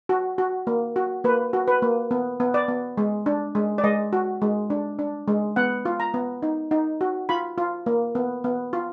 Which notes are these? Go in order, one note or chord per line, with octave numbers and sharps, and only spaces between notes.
F#4
F#4
A#3
F#4
A#3 B4
F#4
B4
A#3
B3
B3
D5
B3
G#3
D4
G#3
D5
G#3 D#5
F#4
G#3
D4
D4
G#3
B3 F#5
F4
A#5
B3
D#4
D#4
F#4
F4 B5
F4
A#3
B3
B3
F4